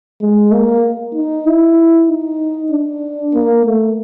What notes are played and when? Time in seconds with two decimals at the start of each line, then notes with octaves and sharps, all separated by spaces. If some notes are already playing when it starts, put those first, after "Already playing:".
0.21 G#3
0.52 A#3
1.15 D#4
1.46 E4
2.09 D#4
2.72 D4
3.34 A#3
3.66 A3